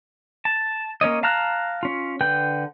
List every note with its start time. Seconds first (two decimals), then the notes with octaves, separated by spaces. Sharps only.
0.45 A5
1.01 A#3 C#4 C#5 D#5
1.23 F5 A5 A#5 F6 F#6
1.83 C#4 F4
2.21 D3 B4 G5 G6